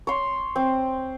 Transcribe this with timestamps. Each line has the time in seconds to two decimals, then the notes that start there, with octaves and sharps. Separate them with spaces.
0.07 C#5 C6
0.56 C4